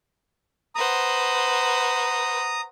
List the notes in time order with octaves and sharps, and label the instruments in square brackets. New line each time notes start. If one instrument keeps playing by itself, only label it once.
[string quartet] B4 C5 F#5 [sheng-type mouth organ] A#5 D#6